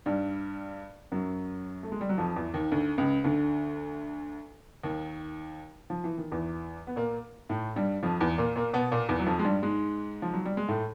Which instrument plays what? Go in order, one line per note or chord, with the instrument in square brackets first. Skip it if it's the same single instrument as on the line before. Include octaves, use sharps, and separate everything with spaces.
[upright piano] G2 G3
F#2 F#3
A3
G#3
G3
F#3
F2 F3
E2 E3
D#2 D#3
D2 D3
C#2 C#3
D2 D3
D#2 D#3
F3
E3
D#3
E2 E3
B3
A#2 A#3
A2 A3
G2 G3
F2 F3
E2 E3
A#2 A#3
A#2 A#3
B2 B3
A#2 A#3
E2 E3
F#3
F2 F3
G#3
G2 G3
G#2 G#3
F3
F#3
G3
G#3
A2 A3